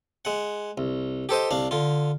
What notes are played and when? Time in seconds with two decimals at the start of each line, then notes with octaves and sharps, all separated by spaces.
0.25 G#3 F#5
0.78 C2
1.29 G4 A4 C5 D#5
1.51 C2 D4 F5
1.71 D3 F4